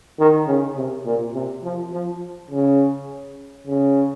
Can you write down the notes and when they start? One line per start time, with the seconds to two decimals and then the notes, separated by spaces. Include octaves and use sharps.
0.19 D#3
0.47 C#3
0.76 C3
1.06 A#2
1.35 C3
1.64 F3
1.92 F3
2.51 C#3
3.67 C#3